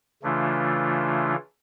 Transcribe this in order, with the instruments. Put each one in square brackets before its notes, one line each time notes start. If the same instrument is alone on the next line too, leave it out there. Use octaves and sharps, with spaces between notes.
[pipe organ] C#3 E3 A3 D4 F4